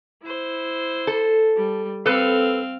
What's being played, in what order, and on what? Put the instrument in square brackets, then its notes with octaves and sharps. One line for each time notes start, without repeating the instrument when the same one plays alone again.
[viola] E4 C5
[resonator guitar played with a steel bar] A4
[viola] G3
[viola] C4 F5 [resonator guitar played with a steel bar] A4 B4